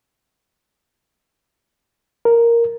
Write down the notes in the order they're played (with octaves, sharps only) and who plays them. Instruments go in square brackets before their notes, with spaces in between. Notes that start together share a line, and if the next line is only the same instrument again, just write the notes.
[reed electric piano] A#4